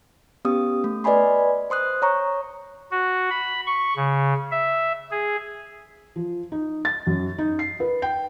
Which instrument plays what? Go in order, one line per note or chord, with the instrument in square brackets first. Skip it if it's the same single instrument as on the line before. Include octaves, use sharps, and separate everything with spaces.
[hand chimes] B3 C#4 G4 D#6
A3
B4 D5 D#5 G#5 B5 C6
C5 C6 D#6 F#6
C#5 A#5 C#6
[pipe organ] F#4
B5
C#6
C#3
E5
G#4
[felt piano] F3
D#4
A6
F#2
D#4
C7
B4
G5